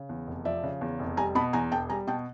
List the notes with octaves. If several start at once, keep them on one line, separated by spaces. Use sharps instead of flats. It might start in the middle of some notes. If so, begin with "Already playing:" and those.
Already playing: C#3
E2
F1
F3 D5 E5
C#3
E2
F1
G3 G#5 A#5
B2 A5 B5
E2 G#5 A#5
E1 G5 A5
G3 G#5 A#5
B2 G5 A5